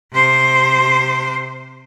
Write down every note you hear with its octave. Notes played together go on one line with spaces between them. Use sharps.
C3 C5